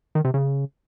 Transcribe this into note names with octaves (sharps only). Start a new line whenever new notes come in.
D#3
C3
C#3